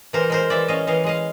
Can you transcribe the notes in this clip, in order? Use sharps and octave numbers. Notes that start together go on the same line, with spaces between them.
E3 A#4 C5
G#3 A#4 C5
E3 D5 E5
C#4 D#5 F5
E3 D#5 F5
G#3 D#5 F5